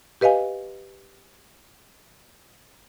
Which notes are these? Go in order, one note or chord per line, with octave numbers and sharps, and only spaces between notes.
G4 B4 D#5 F5 G#5